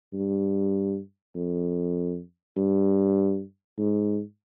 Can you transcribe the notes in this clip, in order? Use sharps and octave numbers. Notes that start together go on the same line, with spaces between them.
G2
F2
G2
G#2